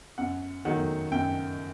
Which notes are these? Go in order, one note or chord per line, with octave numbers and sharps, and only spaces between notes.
F#2 F#5
D#3 F#3 A3 F#5
F#2 G5